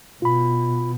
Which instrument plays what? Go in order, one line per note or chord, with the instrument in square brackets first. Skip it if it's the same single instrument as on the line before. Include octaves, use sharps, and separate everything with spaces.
[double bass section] B2 [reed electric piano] F4 B5